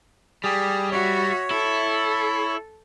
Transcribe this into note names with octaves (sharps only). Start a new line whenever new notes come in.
G3 G4 G#4
F#4 C#5 E5
E4 A4